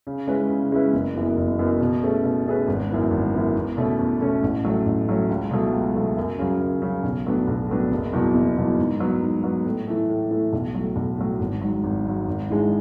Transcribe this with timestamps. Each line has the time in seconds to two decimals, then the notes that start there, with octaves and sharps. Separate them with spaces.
0.07 C#3
0.27 G#3 C#4 E4 B4
0.50 C#3
0.72 G#3 C#4 E4 B4
0.94 F#1
1.15 F#2 E3 B3
1.37 F#1
1.59 F#2 E3 B3
1.80 B2
2.03 A3 C#4 G#4 B4
2.24 B2
2.46 A3 C#4 G#4 B4
2.68 G#1
2.89 F#2 E3 B3
3.11 G#1
3.33 F#2 E3 B3
3.56 E2
3.77 B2 A3 C#4 E4
3.99 E2
4.21 B2 A3 C#4 E4
4.43 A1
4.64 A2 F#3 A3 C#4
4.86 A1
5.08 A2 F#3 A3 C#4
5.29 C#2
5.51 B2 F#3 A3
5.73 C#2
5.95 B2 F#3 A3
6.17 F#2
6.39 C#3 F#3
6.61 F#2
6.82 C#3 F#3
7.04 B1
7.26 A2 F#3 B3 D4
7.48 B1
7.69 A2 F#3 B3 D4
7.91 F#1
8.13 E2 B2 F#3
8.34 F#1
8.57 E2 B2 F#3
8.78 G#2
9.00 F#3 B3
9.22 G#2
9.44 F#3 B3
9.66 A2
9.87 E3 A3
10.09 A2
10.31 E3 A3
10.53 B1
10.75 A2 F#3
10.96 B1
11.18 A2 F#3
11.39 G#1
11.61 G#2 F#3
11.84 G#1
12.05 G#2 F#3
12.28 G#1
12.49 G#2 E3 G#3 D4